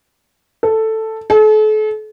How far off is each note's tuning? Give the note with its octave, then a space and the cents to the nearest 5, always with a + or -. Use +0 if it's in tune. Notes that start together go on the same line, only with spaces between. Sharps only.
A4 +5
A4 -40